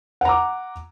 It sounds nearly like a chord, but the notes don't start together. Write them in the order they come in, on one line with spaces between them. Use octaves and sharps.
F#5 A#5 D6